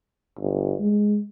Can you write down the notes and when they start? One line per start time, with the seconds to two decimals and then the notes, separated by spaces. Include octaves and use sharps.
0.39 G1
0.80 G#3